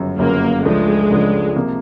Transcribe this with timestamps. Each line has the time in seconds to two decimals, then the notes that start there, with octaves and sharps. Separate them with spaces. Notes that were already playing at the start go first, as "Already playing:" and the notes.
Already playing: G1 F#2 C#3 F#3
0.19 G1 F#2 C#3 F#3 A#3
0.64 C#2 C#3 F3 G#3 A3 D4
1.10 C#2 C#3 F3 A3 D4
1.56 C3 F3 A#3